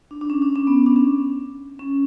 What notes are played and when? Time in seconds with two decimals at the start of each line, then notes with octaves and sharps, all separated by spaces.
0.11 D4
0.21 D4
0.30 C#4
0.42 D4
0.56 C#4
0.67 B3
0.77 C#4
0.86 D4
0.96 C#4
1.79 C#4